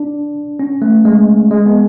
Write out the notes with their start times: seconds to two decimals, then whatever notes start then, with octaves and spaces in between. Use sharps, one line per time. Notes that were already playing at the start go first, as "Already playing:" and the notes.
Already playing: D4
0.60 C#4
0.82 A3
1.05 G#3
1.51 G#3
1.66 B3